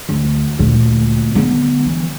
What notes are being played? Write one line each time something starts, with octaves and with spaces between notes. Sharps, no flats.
D2
D2 A#2
D3 B3
E3